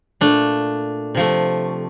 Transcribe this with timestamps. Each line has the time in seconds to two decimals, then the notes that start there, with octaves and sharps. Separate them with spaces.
0.21 A#2 A3 D4
1.15 C3 F3 A3